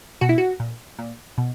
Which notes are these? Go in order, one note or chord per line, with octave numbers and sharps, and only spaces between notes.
B2 F#4
E4
F#4
A#2
A#2
B2